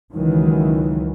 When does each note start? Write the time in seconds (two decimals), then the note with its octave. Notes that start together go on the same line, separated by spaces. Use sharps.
0.14 C#2 D#3 E3 F#3